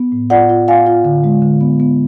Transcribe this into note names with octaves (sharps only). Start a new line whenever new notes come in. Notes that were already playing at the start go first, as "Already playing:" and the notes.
Already playing: B3
A2
F4 D5 F#5
F4
F4 F5 G#5
F4
D3
G#3
D3
B3
B3